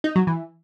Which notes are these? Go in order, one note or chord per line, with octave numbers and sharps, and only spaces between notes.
D#4
F#3
E3